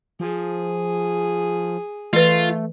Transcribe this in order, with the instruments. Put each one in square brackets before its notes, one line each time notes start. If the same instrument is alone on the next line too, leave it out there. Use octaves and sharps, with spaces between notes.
[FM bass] F3 [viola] G#4
[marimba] E3 B4 [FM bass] A3 [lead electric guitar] F4